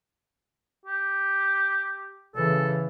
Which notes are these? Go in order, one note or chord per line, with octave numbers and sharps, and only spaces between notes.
G4
C#3 E3 A4